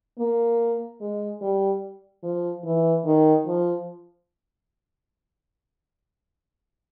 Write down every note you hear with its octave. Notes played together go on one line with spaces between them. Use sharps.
A#3
G#3
G3
F3
E3
D#3
F3